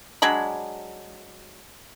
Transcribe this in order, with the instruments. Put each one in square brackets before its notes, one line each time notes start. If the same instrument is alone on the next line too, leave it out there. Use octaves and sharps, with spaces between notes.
[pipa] F#3 G#3 D4 B5